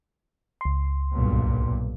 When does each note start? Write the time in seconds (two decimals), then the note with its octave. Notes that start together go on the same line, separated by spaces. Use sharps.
0.61 C#2 C6
1.13 B1 G2 A#2